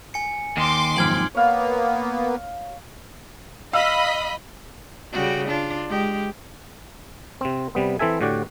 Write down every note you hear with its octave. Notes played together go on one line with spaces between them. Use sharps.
G#5 C#7
D#2 D#3 C6 D6
B1 F2 G#2 F6 G#6 F#7
A#3 B3 C#5 F5
D#5 F5 B5 E6
C#3 G3 F#4
D4 F4
G#3 G4
C3 C4
C3 G3 B3
E3 C4 A4 E5 G#5
A2 D3 F#4 G4 D5 F#5